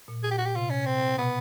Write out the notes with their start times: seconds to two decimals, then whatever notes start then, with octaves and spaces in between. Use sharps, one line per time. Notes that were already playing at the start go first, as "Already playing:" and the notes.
0.08 A#2
0.23 G#4
0.31 G4
0.38 F#4
0.45 G4
0.55 C3 F4
0.70 C#4
0.86 C4
1.18 B2 B3